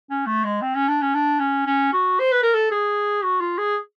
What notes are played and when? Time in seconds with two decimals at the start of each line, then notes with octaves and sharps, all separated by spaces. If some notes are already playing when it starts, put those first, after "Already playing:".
0.10 C#4
0.26 A3
0.44 G#3
0.61 C4
0.75 C#4
0.88 D4
1.01 C#4
1.14 D4
1.39 C#4
1.66 C#4
1.93 F#4
2.20 C5
2.32 B4
2.43 A#4
2.54 A4
2.71 G#4
3.23 F#4
3.40 F4
3.58 G#4